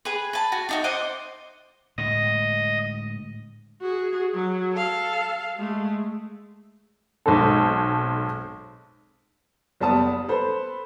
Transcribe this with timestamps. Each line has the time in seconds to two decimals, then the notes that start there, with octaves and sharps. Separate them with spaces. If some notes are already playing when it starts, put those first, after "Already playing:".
0.05 G#4 B4
0.33 B4 A5
0.52 F#4
0.69 D4 D#4 F#4
0.84 C5 D#5 F#5 D6
1.98 A2 D3 G#3 D#5
3.81 F#4 G#4
4.34 F#3
4.72 A4 F5
5.56 G#3 A3
7.26 B1 G#3 C4 A4
9.80 F#1 G3 B3 A5 D#6
10.28 A4 B4 C5